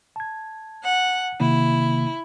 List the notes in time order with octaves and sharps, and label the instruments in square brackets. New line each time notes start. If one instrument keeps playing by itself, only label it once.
[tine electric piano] A5 G#6
[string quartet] F#5
[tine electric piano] C3 D#3 A#3 [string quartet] E4